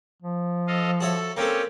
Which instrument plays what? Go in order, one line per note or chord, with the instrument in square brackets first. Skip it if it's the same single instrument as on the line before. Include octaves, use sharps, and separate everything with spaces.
[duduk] F3
[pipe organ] A4 D#5 F5
[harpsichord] F#4 C#5 E5 [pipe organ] A4
[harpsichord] A#3 C4 A4 [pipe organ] C#4 G4